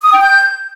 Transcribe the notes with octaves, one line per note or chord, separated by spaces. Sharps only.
D#6
G5
G6